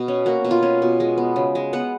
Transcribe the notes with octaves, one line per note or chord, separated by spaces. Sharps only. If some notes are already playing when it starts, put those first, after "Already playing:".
Already playing: B2
C#4
A#3 F#4
B2
F4
C#4
B2
G#3
B3
C#3
G#3
B3 F#5